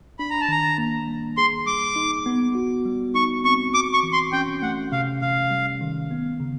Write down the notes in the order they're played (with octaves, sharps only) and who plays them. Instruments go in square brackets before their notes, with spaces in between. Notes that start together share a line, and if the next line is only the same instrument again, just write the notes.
[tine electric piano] D4 [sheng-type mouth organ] B5
[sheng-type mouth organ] A#5
A5
[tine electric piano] D#3 [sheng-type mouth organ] A#5
[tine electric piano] A#3
G3
[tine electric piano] G#4 [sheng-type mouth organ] C6
[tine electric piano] G3 [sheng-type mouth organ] D6
[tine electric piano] D#4
B3
F#4
G3
[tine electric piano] D#4 [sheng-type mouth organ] C#6
[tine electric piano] C4 [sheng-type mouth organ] C#6
[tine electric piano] F#4 [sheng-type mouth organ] D6
[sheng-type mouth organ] C#6
[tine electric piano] E3
[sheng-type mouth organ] C6
[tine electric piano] C#4 [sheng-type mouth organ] G5
[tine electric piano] A3 [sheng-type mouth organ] F#5
[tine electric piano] C3 [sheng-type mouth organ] F5
[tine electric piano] C3 [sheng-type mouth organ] F5
[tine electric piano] G3
D#3
B3
C#3